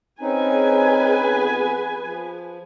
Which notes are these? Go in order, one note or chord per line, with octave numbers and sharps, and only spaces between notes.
C4 C#4 D#4 G#4 B4 G#5
F2 B3
F3